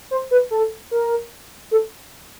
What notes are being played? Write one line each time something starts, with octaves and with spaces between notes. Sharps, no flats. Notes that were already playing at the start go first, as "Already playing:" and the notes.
C5
B4
A4
A#4
A4